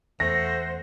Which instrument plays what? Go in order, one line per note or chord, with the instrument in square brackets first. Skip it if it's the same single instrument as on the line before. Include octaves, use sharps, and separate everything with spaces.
[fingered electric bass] E2 [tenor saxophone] A3 [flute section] C5 F#5 [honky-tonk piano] A#6